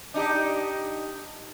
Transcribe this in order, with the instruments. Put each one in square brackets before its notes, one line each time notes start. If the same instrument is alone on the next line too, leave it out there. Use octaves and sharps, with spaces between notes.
[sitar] D4 D#4 G4